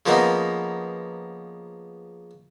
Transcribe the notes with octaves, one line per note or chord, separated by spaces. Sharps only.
C#3 F3 A#3 B3 D#4